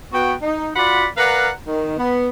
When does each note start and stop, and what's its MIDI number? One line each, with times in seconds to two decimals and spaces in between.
0.13 0.34 59
0.13 0.34 66
0.13 0.34 79
0.42 0.71 63
0.76 1.06 65
0.76 1.06 66
0.76 1.06 74
0.76 1.06 78
0.76 1.06 83
1.17 1.49 70
1.17 1.49 71
1.17 1.49 74
1.17 1.49 77
1.17 1.49 78
1.17 1.49 82
1.66 1.96 51
1.97 2.29 59